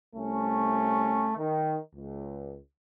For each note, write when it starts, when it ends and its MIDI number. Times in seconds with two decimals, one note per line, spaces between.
0.16 1.33 36
0.16 1.33 57
0.16 1.33 61
1.38 1.77 51
1.95 2.56 37